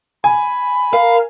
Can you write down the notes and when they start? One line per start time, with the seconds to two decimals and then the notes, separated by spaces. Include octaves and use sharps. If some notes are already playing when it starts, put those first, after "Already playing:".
0.24 G#5 B5
0.93 A#4 F5